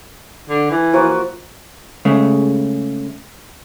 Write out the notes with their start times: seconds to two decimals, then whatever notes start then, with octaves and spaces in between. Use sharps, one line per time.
0.49 D3
0.70 E3
0.93 F3 A#3 F#4
2.05 C#3 G#3 A3